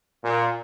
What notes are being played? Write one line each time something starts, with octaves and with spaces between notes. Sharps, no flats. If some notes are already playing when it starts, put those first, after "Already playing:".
A#2